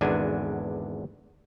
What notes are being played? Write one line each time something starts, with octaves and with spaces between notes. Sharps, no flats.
G#1 E2 D3 B3 D4 G#5